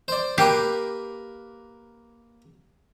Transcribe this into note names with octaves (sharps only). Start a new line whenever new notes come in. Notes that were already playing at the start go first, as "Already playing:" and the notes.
C5 D5
A#3 G4 A#4 B4